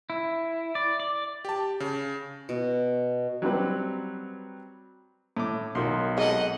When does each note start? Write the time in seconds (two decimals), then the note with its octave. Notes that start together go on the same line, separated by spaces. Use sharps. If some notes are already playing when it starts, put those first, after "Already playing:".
0.10 E4
0.75 D5
1.00 D5
1.45 G4 A5
1.80 C#3
2.49 B2
3.42 F#3 G3 C4 B4
5.37 A2 D6
5.75 B1 D#3 F#4 C6
6.18 G#3 C4 A4 D#5 F#5